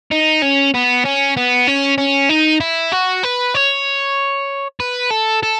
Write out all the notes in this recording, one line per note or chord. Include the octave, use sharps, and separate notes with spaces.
D#4
C#4
B3
C#4
B3
C#4
C#4
D#4
E4
F#4
B4
C#5
B4
A4
A4